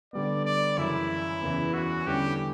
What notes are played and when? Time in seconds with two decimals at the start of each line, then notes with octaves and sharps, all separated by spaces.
0.13 D3 G3 B3 D5
0.45 D5
0.78 F#2 C#3 E3 E4
1.42 E2 C#3 E3
1.74 F#4
2.06 E2 D3 G3 C#4 E4 G4